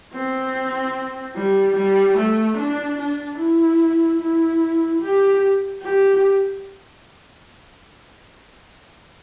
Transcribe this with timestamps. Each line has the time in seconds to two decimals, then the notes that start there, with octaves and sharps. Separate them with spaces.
0.13 C4
1.35 G3
1.76 G3
2.17 A3
2.57 D4
2.98 D4
3.38 E4
4.20 E4
5.01 G4
5.82 G4